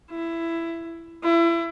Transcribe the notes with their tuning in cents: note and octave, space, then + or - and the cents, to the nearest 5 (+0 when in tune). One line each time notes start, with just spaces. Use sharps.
E4 +15
E4 +30